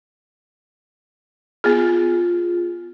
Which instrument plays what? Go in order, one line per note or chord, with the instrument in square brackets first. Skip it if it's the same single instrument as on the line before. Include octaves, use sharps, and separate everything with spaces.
[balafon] B3 G#4 [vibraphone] F4